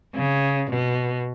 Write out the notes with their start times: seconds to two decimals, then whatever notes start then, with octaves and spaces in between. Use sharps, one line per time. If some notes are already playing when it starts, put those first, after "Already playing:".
0.15 C#3
0.70 B2